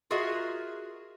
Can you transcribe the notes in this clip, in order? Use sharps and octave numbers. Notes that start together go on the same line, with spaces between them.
F4 F#4 G#4 A#4 D#5 E5